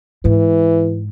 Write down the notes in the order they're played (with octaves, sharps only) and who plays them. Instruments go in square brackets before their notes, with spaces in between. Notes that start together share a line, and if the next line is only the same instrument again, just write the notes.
[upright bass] G#2 [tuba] E3